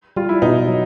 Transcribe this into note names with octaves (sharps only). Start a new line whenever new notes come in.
G3 F4
E4
B2 D#4
F#3